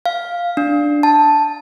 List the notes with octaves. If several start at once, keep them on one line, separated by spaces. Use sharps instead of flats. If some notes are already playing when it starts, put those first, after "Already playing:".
F5
D4
A5